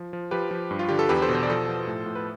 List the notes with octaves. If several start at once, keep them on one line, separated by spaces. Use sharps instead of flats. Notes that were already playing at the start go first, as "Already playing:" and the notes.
Already playing: F3
F3
F3 G4 B4
F3
G2
F4
D3 G4
A4
E2 G4 B4
A4 C5
B2
C5
D5
F3 A4 C5
F3
A2
A2
B4